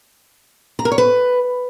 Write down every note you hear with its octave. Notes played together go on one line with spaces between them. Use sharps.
A#5
A#4
C#5
B4